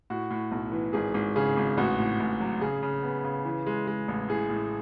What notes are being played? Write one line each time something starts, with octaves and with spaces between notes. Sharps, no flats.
A2 F#4
A2
B1
E3
G#1 G#4
G#1
C#3 G#4
G#1
A1 F#4
A2
A1
F#3
C#3 G#4
C#3
B3
C#3
E3
G#3
G#3
A1
A2 G#4
A2